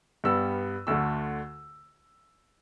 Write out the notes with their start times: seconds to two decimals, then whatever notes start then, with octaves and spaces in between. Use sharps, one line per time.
0.24 G2 G3 B3 E6
0.87 D2 D3 A3 E6